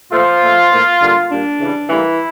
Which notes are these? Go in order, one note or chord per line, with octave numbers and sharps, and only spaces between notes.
A#2 F3 A3 F4
A#2 A3
A2 F3 A#3
D3 G3 A#3
A#2 G3 A#3 D4
C#3 E3 G3
A2 E3 G3 A#3 E4